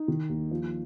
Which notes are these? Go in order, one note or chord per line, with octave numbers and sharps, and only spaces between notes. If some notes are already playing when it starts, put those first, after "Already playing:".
Already playing: D#4
D#3
D#2
F3